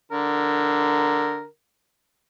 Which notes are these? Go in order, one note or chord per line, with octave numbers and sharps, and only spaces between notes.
D3 A#4